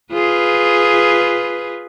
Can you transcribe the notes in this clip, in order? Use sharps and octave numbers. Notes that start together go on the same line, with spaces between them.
F4 G#4 B4